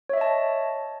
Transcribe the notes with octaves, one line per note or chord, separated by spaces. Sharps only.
C#5 D#5 E5 A5